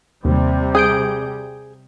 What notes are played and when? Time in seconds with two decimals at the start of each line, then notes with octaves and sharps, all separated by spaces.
0.25 D#2 C3 G3
0.75 G#4 D#6 G6 D7